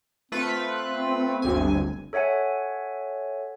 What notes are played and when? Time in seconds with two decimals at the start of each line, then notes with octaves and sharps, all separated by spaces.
0.32 A3 C4 F4 B4
1.42 G1 D2 G#5
2.13 A4 C#5 E5 F#5 G#5